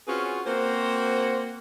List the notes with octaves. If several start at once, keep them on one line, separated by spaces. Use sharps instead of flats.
C4 C#4 F4 F#4 G#4 B4
A#3 C4 F#4 A#4 C5